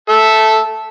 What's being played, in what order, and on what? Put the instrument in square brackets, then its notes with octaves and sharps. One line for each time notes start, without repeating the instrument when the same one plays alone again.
[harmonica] A4 E5